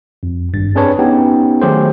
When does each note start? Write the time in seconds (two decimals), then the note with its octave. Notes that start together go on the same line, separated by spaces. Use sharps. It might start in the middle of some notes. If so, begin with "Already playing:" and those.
0.23 F2
0.53 G#1 G2 A6
0.75 C4 D4 G#4 B4 C#5 A5
0.99 B3 C#4 D#4 G4 G5
1.62 D#3 F#3 A3 G4 G#4 C5